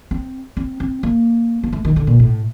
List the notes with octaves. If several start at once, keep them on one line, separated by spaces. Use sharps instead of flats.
C4
C4
C4
A#3
A#3
A3
D#3
D3
A#2
A2